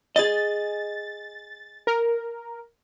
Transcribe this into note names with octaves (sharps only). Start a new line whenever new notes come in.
G#4 D#5 A6
A#4